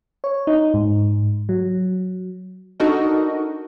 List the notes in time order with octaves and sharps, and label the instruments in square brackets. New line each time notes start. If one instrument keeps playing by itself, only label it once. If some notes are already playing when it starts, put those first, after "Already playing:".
[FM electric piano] C#5
D#4
G#2
F#3
[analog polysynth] D4 D#4 F#4 A4 A#4 D#5